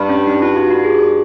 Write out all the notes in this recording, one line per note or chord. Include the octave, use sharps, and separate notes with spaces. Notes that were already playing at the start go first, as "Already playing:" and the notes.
Already playing: G2
C#4
D#4
F4
F#4
F#4
G#4